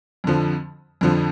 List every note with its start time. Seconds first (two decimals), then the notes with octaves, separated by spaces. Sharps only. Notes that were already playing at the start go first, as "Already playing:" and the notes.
0.24 F2 D3 F3
1.01 F2 D3 F3